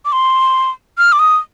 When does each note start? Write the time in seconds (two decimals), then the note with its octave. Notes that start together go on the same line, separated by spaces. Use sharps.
0.05 D6
0.12 C6
0.98 F6
1.12 D6
1.19 D#6